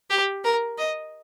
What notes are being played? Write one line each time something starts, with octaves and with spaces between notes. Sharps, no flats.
G4
A#4
D#5